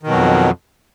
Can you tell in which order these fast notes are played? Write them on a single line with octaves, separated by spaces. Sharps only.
D#3 B2 F#3 F2